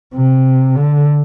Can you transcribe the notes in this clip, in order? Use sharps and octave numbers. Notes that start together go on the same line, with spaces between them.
C3
D3